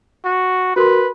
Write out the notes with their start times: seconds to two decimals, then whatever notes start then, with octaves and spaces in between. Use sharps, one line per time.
0.25 F#4
0.76 F#4 A#4 B4 C6